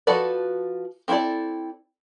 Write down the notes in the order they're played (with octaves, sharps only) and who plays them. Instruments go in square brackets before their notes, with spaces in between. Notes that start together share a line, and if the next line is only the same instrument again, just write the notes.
[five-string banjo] F3 F#4 A4 B4 D5
C4 E4 F#4 A4 D5